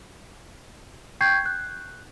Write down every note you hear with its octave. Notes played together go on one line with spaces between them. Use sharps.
G5 C#6 G6 G#6 C7
F#6